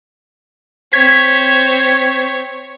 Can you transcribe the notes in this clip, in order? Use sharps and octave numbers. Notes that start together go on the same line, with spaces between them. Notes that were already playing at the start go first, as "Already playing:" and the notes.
C4 C#5 G#6 B6